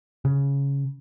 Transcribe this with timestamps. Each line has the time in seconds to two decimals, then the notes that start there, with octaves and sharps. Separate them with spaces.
0.25 C#3